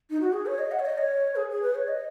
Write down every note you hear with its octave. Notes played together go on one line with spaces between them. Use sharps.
D#4
F#4
G#4
C#5
D#5
F#5
C#5
D#5
C#5
G#4
G#4
B4
C#5
D#5